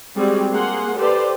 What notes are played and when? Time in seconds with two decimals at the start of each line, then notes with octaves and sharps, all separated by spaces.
0.16 G3 G#3 C4 F#4 G#4
0.51 A#3 G#4 F#5 C6
0.98 G4 A4 B4 C5 D5